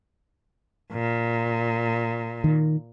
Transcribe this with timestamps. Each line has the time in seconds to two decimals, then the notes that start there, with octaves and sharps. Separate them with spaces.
0.92 A#2
2.44 D#3